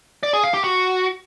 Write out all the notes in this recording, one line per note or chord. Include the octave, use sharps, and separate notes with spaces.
D5
G#4
F5
G4
F#4